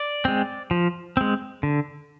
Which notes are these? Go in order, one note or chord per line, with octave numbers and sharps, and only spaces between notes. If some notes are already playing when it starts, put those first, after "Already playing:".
Already playing: D5
G#3 C4
F3
G#3 C4
D3